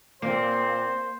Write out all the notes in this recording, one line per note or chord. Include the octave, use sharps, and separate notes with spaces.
A#2 A#3 C4 C5